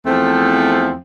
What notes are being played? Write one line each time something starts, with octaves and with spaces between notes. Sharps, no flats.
E2 F3 A3 C4